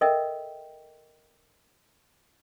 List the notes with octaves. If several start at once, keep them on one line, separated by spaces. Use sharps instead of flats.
A4 A#4 D#5 E5 G5